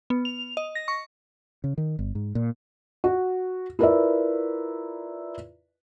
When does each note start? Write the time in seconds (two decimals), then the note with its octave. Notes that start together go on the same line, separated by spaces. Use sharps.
0.10 B3
0.25 F7
0.57 D#5
0.75 A#6
0.88 C#6
1.64 C#3
1.78 D#3
1.99 G1
2.15 G#2
2.35 A#2
3.04 F#4
3.79 E4 F4 A#4 B4 D5 E5